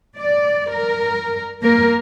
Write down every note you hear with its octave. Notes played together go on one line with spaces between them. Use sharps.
D5
A#4
A#3 A#4